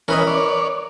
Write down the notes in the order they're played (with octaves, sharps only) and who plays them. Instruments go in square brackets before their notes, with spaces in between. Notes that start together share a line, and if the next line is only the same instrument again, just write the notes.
[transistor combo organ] E3 C#4 [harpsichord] A#4 B4 D#5
[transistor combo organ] C#5 D5